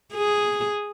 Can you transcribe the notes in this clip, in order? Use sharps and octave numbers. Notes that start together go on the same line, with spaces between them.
G#4